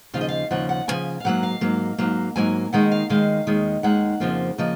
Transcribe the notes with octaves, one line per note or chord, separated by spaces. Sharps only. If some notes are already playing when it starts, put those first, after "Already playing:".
D#2 C#3 F3 F5
D#5
F5
D#2 C#3 F3 F#5
F#5
D#2 C#3 F3 G#5
F5
G#2 F#3 A#3 F#5
F5
G#2 F#3 A#3
G#2 F#3 A#3
G#2 F#3 A#3 G#5
D#2 D#3 G#3 F#5
F5
D#2 D#3 G#3 F5
D#2 D#3 G#3
D#2 D#3 G#3 F#5
F2 C#3 F3 A#3
C#3 F3 A#3 D#5